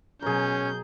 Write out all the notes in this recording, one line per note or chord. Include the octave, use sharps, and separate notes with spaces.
B2 F#3 C#4 G#4 A#4 G6